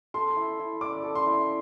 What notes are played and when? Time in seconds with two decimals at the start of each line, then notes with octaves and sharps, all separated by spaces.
0.14 A4 C6
0.37 E4
0.60 E4
0.81 D5 D6
1.04 A4
1.15 C6
1.27 E4